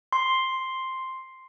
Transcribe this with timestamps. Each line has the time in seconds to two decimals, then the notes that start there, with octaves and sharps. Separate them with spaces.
0.13 C6